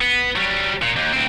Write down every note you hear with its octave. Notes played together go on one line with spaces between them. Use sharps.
B3
F#3 G3
A#2
D#2
D2 C4